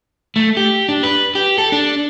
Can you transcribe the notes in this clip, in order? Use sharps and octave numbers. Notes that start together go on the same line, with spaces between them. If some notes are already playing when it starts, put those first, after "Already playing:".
A3
G4
D4
B4
G4
A4
D4